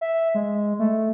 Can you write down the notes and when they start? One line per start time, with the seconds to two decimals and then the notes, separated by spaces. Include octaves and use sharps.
0.01 E5
0.35 G#3
0.79 A3